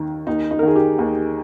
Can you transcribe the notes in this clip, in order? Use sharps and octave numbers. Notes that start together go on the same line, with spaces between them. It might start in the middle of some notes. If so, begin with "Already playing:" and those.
Already playing: D#2 D#3
D#2 D#4
D#4
A#4
D#3 G#4
G4
D#2